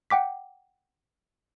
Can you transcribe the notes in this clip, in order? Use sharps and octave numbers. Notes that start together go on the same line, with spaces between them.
F#5 G5 D6 B6